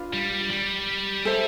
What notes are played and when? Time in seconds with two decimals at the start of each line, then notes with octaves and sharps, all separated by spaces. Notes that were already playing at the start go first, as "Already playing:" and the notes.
Already playing: D4 F4 B4
0.13 G3
0.50 G3
1.25 A4 C5 E5